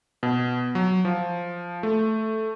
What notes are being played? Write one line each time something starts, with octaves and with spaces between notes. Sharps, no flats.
B2
F#3
F3
A3